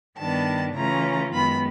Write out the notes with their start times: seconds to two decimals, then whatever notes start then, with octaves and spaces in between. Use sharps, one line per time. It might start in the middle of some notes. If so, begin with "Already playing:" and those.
0.18 G2 D#3 G3 B3 D4 A5
0.75 C#3 E3 A3 C#4 F4 A#5
1.33 F#2 D#3 G#3 B3 B5